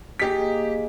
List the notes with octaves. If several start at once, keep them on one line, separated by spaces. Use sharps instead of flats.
A#3 D#4 G4 G#4 B6